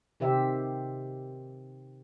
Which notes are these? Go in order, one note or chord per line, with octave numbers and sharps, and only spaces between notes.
C3 D#3 G4 C5 E5